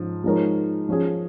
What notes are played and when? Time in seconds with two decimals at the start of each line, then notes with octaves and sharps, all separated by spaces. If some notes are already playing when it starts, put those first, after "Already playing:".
Already playing: G#2 F3 C#4
0.24 F3 G#3 D#4 A#4 C#5
0.89 F3 C#4 G#4